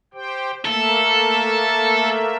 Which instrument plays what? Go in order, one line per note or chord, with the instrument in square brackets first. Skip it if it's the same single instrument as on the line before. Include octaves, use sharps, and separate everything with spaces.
[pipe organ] G4 C5 G5
[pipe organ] A3 A#3 E5 [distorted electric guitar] A4